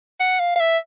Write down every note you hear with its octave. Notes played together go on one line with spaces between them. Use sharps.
F#5
F5
F5
E5